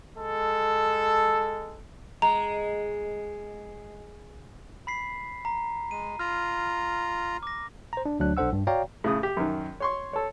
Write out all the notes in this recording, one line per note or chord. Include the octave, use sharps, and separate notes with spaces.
G#3 A4
G#3 A#5
B5 B6 C7
A#5
G#3 D#7
F4 A#5 F6
D6 A#6
C5 A#5
D4
D2 F#3 D4 F#6
B1 D4 A4 C5 F#5 E6
G2
F#4 C#5 D5 F5 G5 A#5
A2 C#3 D#6
G4
F#2 D#3
C#5 C6 C#6
A4 C#5